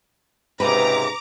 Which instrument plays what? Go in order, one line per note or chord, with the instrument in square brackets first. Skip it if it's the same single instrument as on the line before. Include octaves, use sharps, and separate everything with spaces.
[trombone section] C#2 G#2 C3 [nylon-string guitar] B4 [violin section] A#5 D6